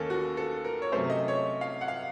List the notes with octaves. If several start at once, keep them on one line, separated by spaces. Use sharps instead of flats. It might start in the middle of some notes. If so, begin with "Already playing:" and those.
Already playing: D#2 D#3 A#3 C#4 A4
F#4
A4
A#4
C#5
C3 F#3 A3 C#4 C5
D#5
C#5
F5
F#5
F5